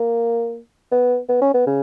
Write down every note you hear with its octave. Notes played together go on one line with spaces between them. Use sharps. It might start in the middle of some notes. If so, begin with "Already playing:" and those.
Already playing: A#3
B3
B3
C#4
B3
C#3